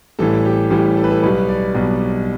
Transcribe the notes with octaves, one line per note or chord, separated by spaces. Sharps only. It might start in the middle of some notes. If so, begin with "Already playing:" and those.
A1 A2 E3 G3 A4
G4
A1 A2 E3 G3 G4
A4
B4
A4
B1 B2 G3 B4
D5
B1 B2 G3